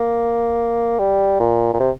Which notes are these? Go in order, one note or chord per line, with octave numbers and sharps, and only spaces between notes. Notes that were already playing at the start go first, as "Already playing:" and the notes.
Already playing: A#3
G3
A#2
A#2
C3